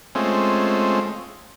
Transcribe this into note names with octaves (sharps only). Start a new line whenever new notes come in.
G#3 A3 C4 C#4 F4